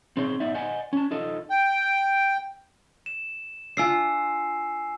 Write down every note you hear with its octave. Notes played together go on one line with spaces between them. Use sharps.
C4 D#4 G#4 C5 C#5
B3 D#4 D5 E5
C5 D5 D#5 F#5 G#5
C#4 A5
D#4 F4 A4 D#5
G5
E7
D4 F4 G#5 E6 C7